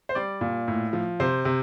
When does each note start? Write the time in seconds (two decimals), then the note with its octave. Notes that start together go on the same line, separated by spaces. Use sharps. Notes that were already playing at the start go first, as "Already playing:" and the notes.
0.09 C5
0.15 G3 D5
0.41 A#2
0.68 A2
0.93 F3
1.20 C3 C5
1.45 C3